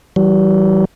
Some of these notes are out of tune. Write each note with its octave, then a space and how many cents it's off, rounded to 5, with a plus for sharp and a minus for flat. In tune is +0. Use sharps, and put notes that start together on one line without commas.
E3 +0 G3 -40